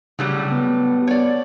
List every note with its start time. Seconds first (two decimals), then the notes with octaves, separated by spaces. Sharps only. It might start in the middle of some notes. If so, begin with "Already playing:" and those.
0.19 A2 C#3 F#3 G3
0.52 B3
1.07 C#5 D5